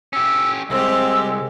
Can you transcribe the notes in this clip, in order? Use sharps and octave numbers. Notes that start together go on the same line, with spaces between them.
C#4 G4 E6
C2 G#3 C4 G4 E6